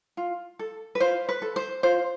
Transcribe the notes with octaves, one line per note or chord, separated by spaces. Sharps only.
F4
A4
B4
F4 C5
B4
A4
C5
F4 C5